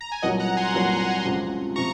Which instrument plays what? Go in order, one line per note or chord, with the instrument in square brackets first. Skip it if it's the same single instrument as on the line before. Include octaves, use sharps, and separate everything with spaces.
[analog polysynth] A#5
G#5
[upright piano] C2 A#2 F#3 [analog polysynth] D#5 F#5
[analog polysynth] F#5 A#5
G#5 C6
[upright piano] C2 A#2 F#3 [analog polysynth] G#5 C6
[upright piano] C#2 C3 F3
[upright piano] C3 F3 [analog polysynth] A#5 C#6